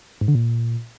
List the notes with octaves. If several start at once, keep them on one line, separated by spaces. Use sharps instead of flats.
G#2
D3
A#2